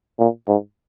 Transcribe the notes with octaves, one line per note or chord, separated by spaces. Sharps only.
A#2
G#2